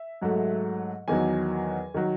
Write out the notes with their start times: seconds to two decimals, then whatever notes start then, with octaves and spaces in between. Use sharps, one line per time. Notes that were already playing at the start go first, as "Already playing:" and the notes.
Already playing: E5
0.22 G#2 F#3 A3
1.08 E2 D#3 F#3 G#5
1.94 D#3 F#3